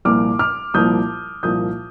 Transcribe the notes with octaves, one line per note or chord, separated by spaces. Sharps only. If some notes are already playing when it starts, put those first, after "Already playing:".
C2 A#2 F3 A#3 D6 F6
D6 F6
C2 A#2 F3 A#3 D#6 G6
C2 A#2 F3 A#3 D#6 G6